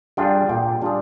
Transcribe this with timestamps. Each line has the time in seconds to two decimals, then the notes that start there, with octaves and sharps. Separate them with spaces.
0.17 G3 D4 F4 G#4 G5
0.49 A#2 G5
0.82 G3 D4 F4 G#4